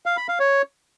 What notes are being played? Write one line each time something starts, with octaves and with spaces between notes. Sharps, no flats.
F5
B5
F5
C#5